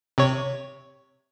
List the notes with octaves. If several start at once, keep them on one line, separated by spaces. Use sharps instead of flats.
C3 C#5